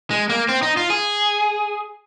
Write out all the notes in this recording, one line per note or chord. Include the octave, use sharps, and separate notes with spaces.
G#3
A#3
C4
D#4
F4
G#4